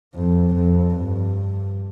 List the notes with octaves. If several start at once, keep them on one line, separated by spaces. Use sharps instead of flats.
F2
F2
G2